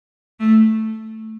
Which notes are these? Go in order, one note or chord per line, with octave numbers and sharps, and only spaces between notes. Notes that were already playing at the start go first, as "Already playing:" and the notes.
A3